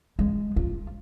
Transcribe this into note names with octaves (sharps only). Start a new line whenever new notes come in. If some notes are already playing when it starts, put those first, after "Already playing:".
G#3
F4